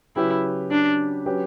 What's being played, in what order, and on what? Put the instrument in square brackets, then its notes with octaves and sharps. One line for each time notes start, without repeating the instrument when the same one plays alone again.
[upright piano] C#3 F#3 C#4 G4 B4 [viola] E4
[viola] D4
[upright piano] F#3 C#4 G4 B4